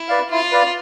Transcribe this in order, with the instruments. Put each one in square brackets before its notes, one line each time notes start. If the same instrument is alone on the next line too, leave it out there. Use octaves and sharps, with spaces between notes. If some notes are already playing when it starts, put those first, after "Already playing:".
Already playing: [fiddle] E4
[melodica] B4 D5 F5
[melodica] E4 [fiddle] F4
[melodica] B4 D5 F5